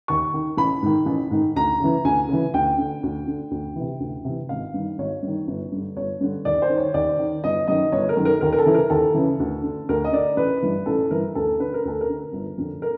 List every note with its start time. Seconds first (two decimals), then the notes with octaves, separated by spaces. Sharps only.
0.08 D#2 C#6
0.34 D#3
0.57 A1 B5
0.82 G#2 D#3
1.06 A1
1.31 G#2 D#3
1.56 D2 A#5
1.80 C#3 E3
2.05 D2 G#5
2.29 C#3 E3
2.54 D2 G5
2.78 D3
3.03 D2
3.27 D3
3.51 D2
3.76 C3 E3
4.00 D2
4.25 C3 E3
4.49 G#1 F5
4.74 G2 D#3
4.98 G#1 C#5
5.23 G2
5.28 D#3
5.47 G1
5.72 G2 D3
5.97 G1 C#5
6.21 G2 D3
6.45 D#2 D5
6.62 C5
6.70 D#3
6.78 C#5
6.94 D#2 D5
7.19 D#3
7.44 G1 D#5
7.68 F#2 D#3 D#5
7.92 G1 C#5
8.09 A#4
8.17 F#2 D#3
8.25 A#4
8.41 D#2 A#4
8.53 A#4
8.58 A4
8.66 C#3 E3
8.75 A#4
8.90 D#2 A4
9.14 C#3 E3
9.40 D2
9.63 D3
9.89 D2 A#4
10.04 D#5
10.13 D3 D5
10.37 A1 B4
10.62 G2 E3
10.86 A1 A4
11.11 G2 E3 A#4
11.35 D2 A4
11.60 D3 B4
11.74 A#4
11.85 D2 A4
12.01 A#4
12.09 D3
12.33 G1
12.58 F2 D3
12.82 A#4